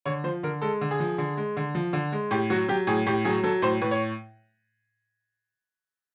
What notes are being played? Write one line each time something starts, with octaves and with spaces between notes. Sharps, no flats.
D3 C#5
F3 C5
D3 A#4
G#3 A4
D3
G#4
F3
D3
G#3
D3
F3
D3
G#3
A2 G4
F#3 F#4
F#3 G4
A2 G#4
A2 G4
F#3 G#4
F#3 A4
A2 C5
A2 B4
C#5